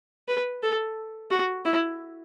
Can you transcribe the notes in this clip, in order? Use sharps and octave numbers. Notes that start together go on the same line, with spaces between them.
B4
A4
F#4
E4